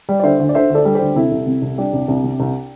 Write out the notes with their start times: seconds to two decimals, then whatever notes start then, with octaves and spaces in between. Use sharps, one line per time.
0.09 G3
0.20 D5
0.23 D3 C5 E5
0.39 D2
0.49 D5
0.55 D3 C5 E5
0.70 D2
0.75 A4 D5
0.85 G3
0.95 G4 C5
1.01 D2
1.16 C3 E4 A4
1.32 C2
1.46 C3
1.62 C2
1.78 G3 D4 G4
1.93 C2
2.08 C2
2.24 C3
2.40 C2